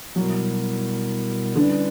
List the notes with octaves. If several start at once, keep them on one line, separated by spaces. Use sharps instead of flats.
B2 F#3 G3 B3 E4 A#4
D3 G3 C#4 E4 B4 D5